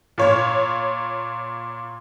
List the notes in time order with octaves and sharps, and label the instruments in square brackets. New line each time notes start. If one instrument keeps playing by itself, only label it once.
[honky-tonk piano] A#2 C#5